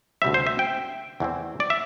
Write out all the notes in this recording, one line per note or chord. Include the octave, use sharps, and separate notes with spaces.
D2 C3 G3 C4 E5
C5
E5
G5
E2 E3 A3 C4
D5
E5